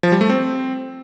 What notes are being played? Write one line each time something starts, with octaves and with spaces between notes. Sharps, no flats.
F3
G3
A3
C4